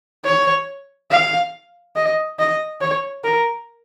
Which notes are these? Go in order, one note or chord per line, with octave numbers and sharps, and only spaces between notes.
C#5
F5
D#5
D#5
C#5
A#4